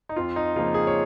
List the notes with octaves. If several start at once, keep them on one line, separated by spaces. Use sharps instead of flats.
D#4
F2 F4
D#4
C#3 F3 A#3 F4
G#4
C#5